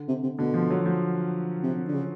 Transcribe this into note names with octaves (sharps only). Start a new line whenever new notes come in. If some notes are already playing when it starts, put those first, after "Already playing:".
Already playing: D3
C3
C3
B2 D3
F3
F#3
F3
C3
D3
C#3